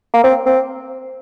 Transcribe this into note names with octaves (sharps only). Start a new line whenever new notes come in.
A#3
C4
C4